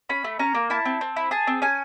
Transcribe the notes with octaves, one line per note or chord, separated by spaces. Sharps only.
C#4 B5
A3
C#4 A#5
A#3
E4 A5
C4
C4
E4
G#4 A5
C4
C#4 G#5